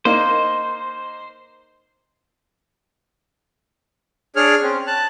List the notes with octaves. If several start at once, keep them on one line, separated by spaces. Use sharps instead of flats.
A#3 D#4 C5 D#5
D4 G#4 C#5 F6
C4 C#4
A5 F#6